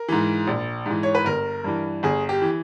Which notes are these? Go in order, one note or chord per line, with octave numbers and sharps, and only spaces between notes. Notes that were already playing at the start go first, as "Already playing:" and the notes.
Already playing: A#4
G#2 E3
A#1
G#2 E3
C#5
B4
G1 A#4
G2 E3
G1 G#4
G4
E3